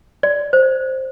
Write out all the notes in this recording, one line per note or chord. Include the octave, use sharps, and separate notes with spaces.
D5
C5